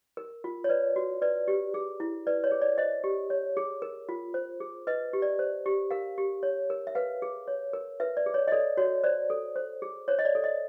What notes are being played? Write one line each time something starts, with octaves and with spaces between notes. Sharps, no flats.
A#4
F4
C#5
B4 D5
F#4
B4 D5
G4
G#4
E4
B4 D5
C#5
G#4
D5
C5 D#5
G4
C#5
G#4
A#4
F4
C5
G#4
B4 D#5
G4
D5
C5
G4
A#4 F5
G4
C#5
A#4
E5
B4 F5
G#4
C#5
A#4
B4 E5
D5
G#4
C#5
D#5
A4 D5
F#4 C#5
C5 D5
A4
C5
G#4
C5 C#5
D#5
D5
A4
D#5